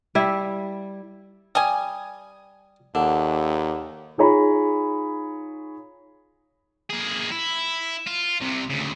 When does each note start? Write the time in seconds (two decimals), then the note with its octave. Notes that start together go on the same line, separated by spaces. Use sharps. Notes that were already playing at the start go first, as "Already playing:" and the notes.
0.15 G3 E4
1.55 G3 G#5 D#6
2.95 D#2 D3
4.18 D#4 F4 G#4 C#5 A#5 B5
6.90 A#3 G#4
7.32 E4
8.07 F4
8.41 C2 C3
8.70 D2 C#3